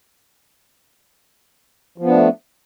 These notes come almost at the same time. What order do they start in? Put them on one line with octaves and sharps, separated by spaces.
F3 B3 D4 A3